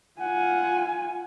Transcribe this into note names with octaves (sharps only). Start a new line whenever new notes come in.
F4 F#5 G#5